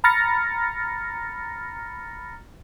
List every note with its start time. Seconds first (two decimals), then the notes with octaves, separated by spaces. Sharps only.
0.04 A#5 B5 F6 A6 A#6 C#7